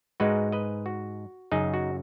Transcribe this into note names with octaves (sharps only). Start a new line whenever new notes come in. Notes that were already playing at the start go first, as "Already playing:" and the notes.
G#2 G#3 D#4 F#4 B4
B4 D#5
F#4
F#2 C#3 F#3 D#4 G#4
F#4